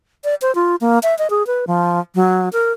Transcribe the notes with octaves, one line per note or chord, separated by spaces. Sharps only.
D5
C5
F4
A#3
E5
D#5
G#4
B4
F3
F#3
A#4